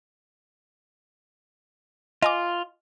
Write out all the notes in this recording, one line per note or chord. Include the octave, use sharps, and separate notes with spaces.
F4 D#5 G#5 D6